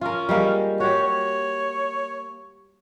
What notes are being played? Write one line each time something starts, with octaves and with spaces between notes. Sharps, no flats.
C#4 F4 A#4
G3 G#3 A#3
F#4 G4 C#5
C#5